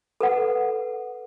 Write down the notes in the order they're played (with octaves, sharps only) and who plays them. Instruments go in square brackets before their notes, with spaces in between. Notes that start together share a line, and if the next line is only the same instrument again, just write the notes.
[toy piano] A4 B4 F#5